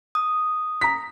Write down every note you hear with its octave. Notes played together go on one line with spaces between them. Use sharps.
D#6
A#5 B6